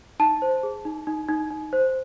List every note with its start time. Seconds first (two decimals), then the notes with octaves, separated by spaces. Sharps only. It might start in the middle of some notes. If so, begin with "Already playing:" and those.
0.20 D#4 A5
0.42 C5
0.63 G#4
0.85 D#4
1.07 D#4
1.29 D#4
1.51 D#4
1.73 C5